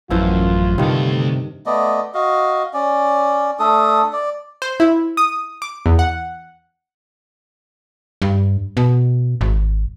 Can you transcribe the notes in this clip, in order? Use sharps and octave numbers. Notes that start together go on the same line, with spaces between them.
A1 F#2 E3 F3 F4 C5
D2 G2 C3 D#3 A4
A3 B3 D5 D#5
F#4 D#5 F5
C#4 D5
A3 D4 A4 D#6
D5
C5
E4
D#6
D6
E2
F#5
G2
B2
G#1